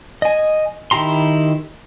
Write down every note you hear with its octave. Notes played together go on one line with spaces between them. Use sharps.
D#5 G#5
D#3 E4 G4 A#5 C6